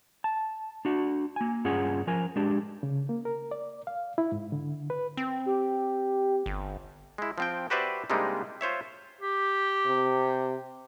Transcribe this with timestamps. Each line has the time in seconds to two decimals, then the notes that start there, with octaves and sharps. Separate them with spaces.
0.24 A5
0.85 D4 F#4
1.36 A#3 G#5
1.64 G2 C#4 F4 G#4 F#5
2.07 F3 A#4 G#5
2.36 G#3 D4 G4
2.83 C#3
3.09 A#3
3.25 A#4
3.51 D5
3.87 F5
4.18 E4
4.32 G#2
4.52 D3
4.90 B4
5.17 C4
5.46 G4
6.46 G1
7.18 G#3 E4
7.38 F3 C4 G5
7.70 F#4 G4 B4 C5 D5 E5
8.10 C3 G3 G#3 A#3 D4 D#4
8.61 F4 C5 C#5 E5
9.21 G4
9.86 C3